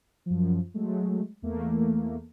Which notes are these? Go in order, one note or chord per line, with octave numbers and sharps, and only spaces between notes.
F#2 F3
F#3 G#3 A3
E2 A3 A#3